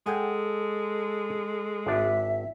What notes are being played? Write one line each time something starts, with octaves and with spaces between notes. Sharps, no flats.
G#3 G#4 A4 F#5 G5
G#1 D4 E5